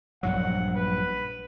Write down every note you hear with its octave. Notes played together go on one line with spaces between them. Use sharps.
A#1 G2 F#3 F#5
B4